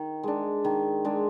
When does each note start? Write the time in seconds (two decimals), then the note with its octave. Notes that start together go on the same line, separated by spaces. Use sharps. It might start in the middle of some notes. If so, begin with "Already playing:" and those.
Already playing: D#3
0.23 G#3 D4
0.64 D#3
1.05 G#3 D4